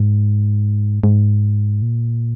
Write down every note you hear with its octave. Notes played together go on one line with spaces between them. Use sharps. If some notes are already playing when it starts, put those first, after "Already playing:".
Already playing: G#2
G#2
A#2